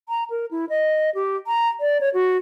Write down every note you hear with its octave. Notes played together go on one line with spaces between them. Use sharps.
A#5
A#4
E4
D#5
G4
A#5
D5
C#5
F#4